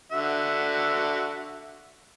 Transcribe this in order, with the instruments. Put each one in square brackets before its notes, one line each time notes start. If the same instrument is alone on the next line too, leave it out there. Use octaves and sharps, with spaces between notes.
[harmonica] D3 F#4 E5